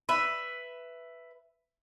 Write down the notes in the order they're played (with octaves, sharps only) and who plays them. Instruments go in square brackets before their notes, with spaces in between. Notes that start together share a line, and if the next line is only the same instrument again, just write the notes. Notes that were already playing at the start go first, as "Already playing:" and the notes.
[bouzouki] B4 E5